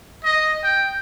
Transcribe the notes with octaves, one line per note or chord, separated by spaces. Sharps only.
D#5
G5